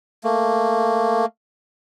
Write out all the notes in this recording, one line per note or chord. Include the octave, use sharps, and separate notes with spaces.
A3 A#3